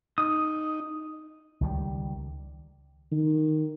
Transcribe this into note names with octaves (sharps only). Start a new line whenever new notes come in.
D#4 D#6
C#2 D#3 G3
D#3